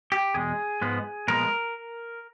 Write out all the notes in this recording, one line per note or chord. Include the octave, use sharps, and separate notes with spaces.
G4
E2 B2 G#3 G#4
G#2 F3 G#3 B3
A#2 F3 G#3 B3 A#4